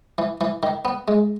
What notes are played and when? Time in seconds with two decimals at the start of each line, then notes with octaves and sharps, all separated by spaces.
0.18 E3
0.41 E3
0.63 D#3
0.85 B3
1.08 G#3